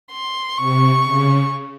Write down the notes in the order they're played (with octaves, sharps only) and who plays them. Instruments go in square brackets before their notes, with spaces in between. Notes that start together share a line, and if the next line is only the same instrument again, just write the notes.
[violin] C6
[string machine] C3 [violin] C#6
[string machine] C#3